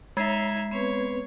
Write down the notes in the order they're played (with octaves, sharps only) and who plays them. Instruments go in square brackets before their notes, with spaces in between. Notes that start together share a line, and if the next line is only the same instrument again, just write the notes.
[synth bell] G#3 G#6 C7 [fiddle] D#4 E5
[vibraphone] B3 C4 B4 [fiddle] C#5